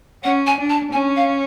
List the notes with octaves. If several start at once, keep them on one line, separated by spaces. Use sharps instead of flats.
C#4 F#5
G#5
D4
A5
C#4 G#5
F5